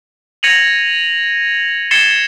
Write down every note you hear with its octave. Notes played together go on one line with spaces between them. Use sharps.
G#6 A#6 C#7 D#7 F7 F#7
G#6 A6 C7 C#7 E7 G7